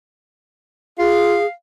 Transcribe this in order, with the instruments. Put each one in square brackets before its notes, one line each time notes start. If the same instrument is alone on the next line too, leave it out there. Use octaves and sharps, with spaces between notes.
[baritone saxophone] F4 [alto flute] G#4 [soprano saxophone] F5